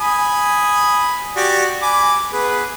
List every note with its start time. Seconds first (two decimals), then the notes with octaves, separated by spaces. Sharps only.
0.01 G#5 B5 D#6
1.36 F#4 G4 D5
1.82 G#5 B5 D6
2.33 B3 G#4 B4